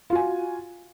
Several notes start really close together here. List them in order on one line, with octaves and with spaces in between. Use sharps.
F4 F#4 G#5